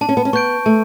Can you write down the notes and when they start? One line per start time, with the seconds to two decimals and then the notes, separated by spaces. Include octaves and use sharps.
0.01 D4 A5
0.09 C#4
0.17 B3
0.25 C#4
0.33 B3 C#6 G6 D7
0.66 A3 A5